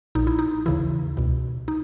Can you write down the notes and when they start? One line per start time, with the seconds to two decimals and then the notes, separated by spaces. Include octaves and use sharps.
0.15 A#1 A#2 D#4
0.27 E4
0.39 D#4
0.66 D#2 C#3 E3 E4
1.17 C#2 B2
1.68 D#4